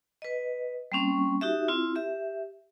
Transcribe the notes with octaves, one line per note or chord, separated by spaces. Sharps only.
B4 D#5
G3 A#3 C4 C#4 C#6
D#4 F#4 G4 E5
C4 E4 F4
G4 E5